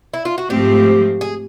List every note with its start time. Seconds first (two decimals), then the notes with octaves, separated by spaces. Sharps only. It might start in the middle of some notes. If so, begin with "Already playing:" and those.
0.14 E4
0.25 F4
0.38 F#4
0.50 G#2 F3 A3 C4 G4
1.21 G#4